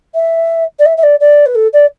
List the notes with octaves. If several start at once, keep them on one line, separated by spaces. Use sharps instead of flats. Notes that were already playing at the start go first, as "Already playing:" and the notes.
E5
D5
E5
E5
D5
D5
B4
A4
D5